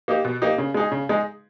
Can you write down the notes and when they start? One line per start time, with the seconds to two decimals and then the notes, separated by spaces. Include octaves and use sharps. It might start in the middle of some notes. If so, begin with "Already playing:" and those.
0.08 A#3 D#4 G4
0.25 B2
0.42 A#3 D#4 G4
0.58 C#3
0.74 G#3 D#4 G#4
0.91 C#3
1.09 G#3 D#4 G#4